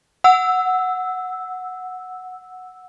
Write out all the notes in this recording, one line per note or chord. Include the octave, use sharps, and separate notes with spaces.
F#5 E6